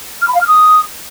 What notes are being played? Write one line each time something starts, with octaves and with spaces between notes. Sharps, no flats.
F6
B5
F5
F6
D#6